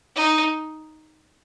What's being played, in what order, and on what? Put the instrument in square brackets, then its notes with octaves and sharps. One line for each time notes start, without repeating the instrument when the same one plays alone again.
[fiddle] D#4